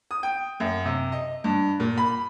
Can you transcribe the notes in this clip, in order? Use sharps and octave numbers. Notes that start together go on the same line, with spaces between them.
D#6
G5
F#2
C3
D#5
G2
A#2
B5